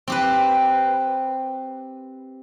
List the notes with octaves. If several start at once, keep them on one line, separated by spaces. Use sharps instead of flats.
C4 G4 B4